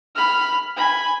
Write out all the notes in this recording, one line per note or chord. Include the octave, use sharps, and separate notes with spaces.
B5 F6
G#5 B5